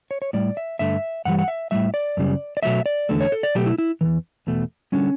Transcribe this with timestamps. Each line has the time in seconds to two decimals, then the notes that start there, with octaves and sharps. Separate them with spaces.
0.11 C#5
0.22 C#5
0.33 A2 G3 D5
0.57 E5
0.79 G2 D3 A3 E5
1.25 G2 E3 G3 F#5
1.39 F#5
1.48 E5
1.71 A2 G3 E5
1.94 D5
2.17 F#2 C#3 G3
2.57 D5
2.63 B2 F#3 A3 E5
2.86 D5
3.09 E2 D3 A3
3.21 C#5
3.32 A4
3.43 D5
3.55 B2 F#3 A3 G4
3.66 E4
3.78 E4
4.01 C#3 E3
4.05 E2
4.47 E2 B2 A3
4.92 D3 G3 C#4